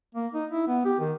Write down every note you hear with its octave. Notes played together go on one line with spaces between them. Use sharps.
A#3
D#4
E4
B3
G4
D#3